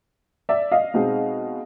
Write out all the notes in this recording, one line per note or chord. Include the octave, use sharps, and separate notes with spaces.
D5 E5
D#5 F5
B2 G#3 C4 D#4